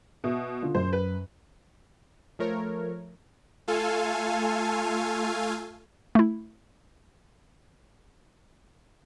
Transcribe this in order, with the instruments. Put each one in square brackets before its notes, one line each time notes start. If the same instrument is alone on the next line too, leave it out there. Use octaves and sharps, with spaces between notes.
[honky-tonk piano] B2 [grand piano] E5
[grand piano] D3 F4
[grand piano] F#2 [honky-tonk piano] C5
[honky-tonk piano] B4
[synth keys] F3 A3 A#4 C#5
[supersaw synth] A3 F4 A4 F5 G#5
[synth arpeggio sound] A3 E4